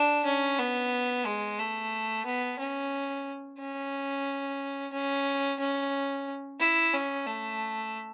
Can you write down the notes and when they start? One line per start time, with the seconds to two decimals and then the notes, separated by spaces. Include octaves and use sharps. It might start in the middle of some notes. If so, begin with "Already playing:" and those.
Already playing: D4
0.25 C#4
0.58 B3
1.26 G#3
1.59 A3
2.25 B3
2.59 C#4
3.59 C#4
4.93 C#4
5.60 C#4
6.60 E4
6.94 C#4
7.27 A3